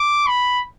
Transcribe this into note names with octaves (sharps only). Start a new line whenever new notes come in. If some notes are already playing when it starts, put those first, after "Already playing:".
Already playing: D6
B5